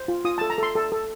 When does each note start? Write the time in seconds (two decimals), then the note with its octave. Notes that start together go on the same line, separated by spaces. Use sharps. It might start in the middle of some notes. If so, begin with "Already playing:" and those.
Already playing: C5
0.08 F4
0.25 F4 D#6
0.38 A4 A5
0.50 A#5
0.58 A4 C6
0.75 A4
0.92 A4